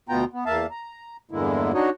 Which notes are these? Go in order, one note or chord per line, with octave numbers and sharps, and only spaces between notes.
D2 B2 B3 F4 G5 A#5
B3
E2 A#3 E5 F5 A5
A#5
E2 G2 D3 G#3 A#3 E4
D4 D#4 F#4 C#5 D#5